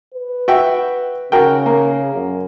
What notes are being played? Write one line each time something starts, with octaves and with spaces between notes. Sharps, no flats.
B4
F#4 E5 G5
C#3 F#4 A#4 G5
A#3
F#2